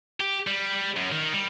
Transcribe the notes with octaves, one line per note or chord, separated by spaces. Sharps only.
G4
G3
F#2
D#3
G3